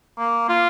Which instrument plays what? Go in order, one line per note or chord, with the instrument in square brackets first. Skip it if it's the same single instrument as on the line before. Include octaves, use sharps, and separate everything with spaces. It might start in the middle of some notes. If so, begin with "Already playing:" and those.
[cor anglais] A#3
F4